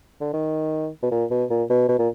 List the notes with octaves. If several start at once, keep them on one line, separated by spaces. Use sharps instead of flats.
D3
D#3
B2
A#2
B2
A#2
B2
B2
A#2